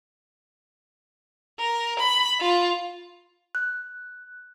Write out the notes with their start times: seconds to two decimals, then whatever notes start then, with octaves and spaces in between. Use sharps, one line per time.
1.59 A#4
1.99 B5
2.41 F4
3.55 F#6